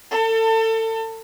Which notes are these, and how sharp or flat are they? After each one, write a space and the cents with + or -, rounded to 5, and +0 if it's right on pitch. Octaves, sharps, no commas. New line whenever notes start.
A4 +30